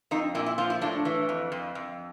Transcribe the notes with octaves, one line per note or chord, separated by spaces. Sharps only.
F2 D#4
A#2 E4
E4
F3 F4
E4
A2 D4
E3
F2
F2
F2